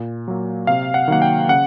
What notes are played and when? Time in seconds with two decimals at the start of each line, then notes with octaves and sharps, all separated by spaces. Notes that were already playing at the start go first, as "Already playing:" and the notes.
Already playing: A#2
0.28 F#3 A#3
0.67 C3 F5
0.94 F#5
1.08 D#3 F#3 A#3 F#5
1.22 G5
1.49 C#3 F#5